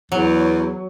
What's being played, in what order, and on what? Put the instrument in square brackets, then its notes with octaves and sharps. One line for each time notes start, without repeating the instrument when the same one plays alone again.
[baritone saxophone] E2 [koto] F#3